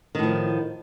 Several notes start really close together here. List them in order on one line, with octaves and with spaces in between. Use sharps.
D#3 A2 F3